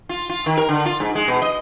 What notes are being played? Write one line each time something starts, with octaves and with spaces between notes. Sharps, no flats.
F4
F4
D#3
A#4
D3
F4
G#2
G#3
B2
D#5